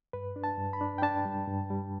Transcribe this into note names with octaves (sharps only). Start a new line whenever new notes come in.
G2 B4
D4
A5
G2
B5
D4
G5
D4 A5
G3
G2
G3